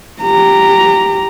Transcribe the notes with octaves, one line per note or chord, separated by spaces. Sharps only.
G4 A#5